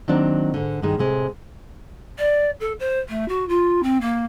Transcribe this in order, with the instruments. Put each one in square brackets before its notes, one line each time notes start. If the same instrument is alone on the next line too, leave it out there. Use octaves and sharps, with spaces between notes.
[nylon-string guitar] D#3 F#3 A#3 C4 D4
G#2 D3
G2 B2 D#3 G#3
A2 C3 G#3
[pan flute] D5
A4
C5
A3
F#4
F4
C4
A#3